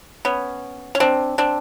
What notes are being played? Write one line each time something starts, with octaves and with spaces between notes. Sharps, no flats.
B3 C#4
C#4
C4 D4
C4 D4